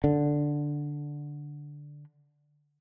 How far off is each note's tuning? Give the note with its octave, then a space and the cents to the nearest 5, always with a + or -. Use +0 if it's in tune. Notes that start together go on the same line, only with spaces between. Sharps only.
D3 +0